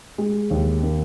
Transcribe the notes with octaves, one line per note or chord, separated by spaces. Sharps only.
G#3
D#2
D#3